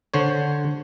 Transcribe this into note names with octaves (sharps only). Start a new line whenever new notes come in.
D3 C5 C#5